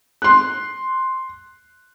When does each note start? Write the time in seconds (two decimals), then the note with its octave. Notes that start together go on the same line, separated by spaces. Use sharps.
0.22 C6 F#6